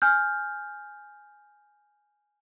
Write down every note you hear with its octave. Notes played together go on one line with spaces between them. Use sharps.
G#5 F6 G6